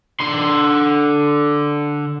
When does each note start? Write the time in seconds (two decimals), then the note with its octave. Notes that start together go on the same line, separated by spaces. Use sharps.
0.20 D3 C6